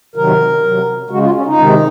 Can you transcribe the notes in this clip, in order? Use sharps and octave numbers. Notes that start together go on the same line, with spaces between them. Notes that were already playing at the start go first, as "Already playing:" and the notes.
C3 D#3 F#3 A#4
C3 F#3
C#3 G#3 F#4
F4
C#4
D#4
C3 D#3 G#3